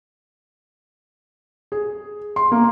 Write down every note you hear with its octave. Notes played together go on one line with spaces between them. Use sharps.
G#4
C6
A#3